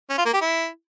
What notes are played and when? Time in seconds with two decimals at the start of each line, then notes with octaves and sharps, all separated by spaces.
0.10 C#4
0.18 F4
0.25 A#3
0.33 G4
0.41 E4